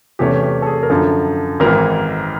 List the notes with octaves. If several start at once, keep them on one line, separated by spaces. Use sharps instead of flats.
E2 C3 E3 A3 C#4 G4
G4
A4
G#4
A#4
F#2 D3 F3 A4
G#1 G#2 E3 A#4